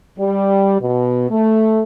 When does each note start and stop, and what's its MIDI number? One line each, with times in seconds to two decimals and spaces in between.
0.19 0.76 55
0.81 1.26 47
1.31 1.83 57